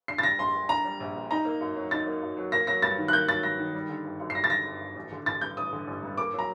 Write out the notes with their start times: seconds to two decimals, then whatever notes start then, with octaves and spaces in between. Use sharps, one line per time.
0.08 D4 C7
0.18 A6
0.23 G3 A#6
0.39 A#1 C6
0.54 A#2
0.69 D4 A#5
0.84 G3
1.00 A#1
1.15 A#2
1.31 D#4 A#5
1.45 A#3
1.61 F#2
1.76 F#3
1.91 D#4 A6
2.07 A#3
2.22 F#2
2.37 F#3
2.52 A#3 A#6
2.67 F#3 A#6
2.82 G2 A6
2.98 D#3
3.08 F#6
3.13 A#3 G6
3.28 F#3 A6
3.43 G2 A#6
3.59 D#3
3.74 G3
3.89 D3
4.04 G1
4.20 F#2
4.30 C7
4.35 G3 A#6
4.44 A6
4.50 D3 A#6
4.65 G1
4.80 F#2
4.95 A1
5.12 D3
5.26 A1 A6
5.41 G2 G6
5.57 A1 D#6
5.73 D3
5.87 A1
6.03 G2
6.18 A#3 D6
6.33 F#3
6.39 A#5